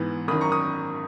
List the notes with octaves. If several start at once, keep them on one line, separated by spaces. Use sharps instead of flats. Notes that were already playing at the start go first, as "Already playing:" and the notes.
Already playing: G#2 E3 B3
G#1 F#2 D#3 B5 D#6
A#5 C#6
D#6